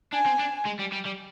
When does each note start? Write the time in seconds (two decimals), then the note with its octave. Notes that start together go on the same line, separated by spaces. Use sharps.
0.13 D4 G#5
0.26 C4
0.39 D4
0.65 G#3
0.79 G3
0.92 G3
1.05 G3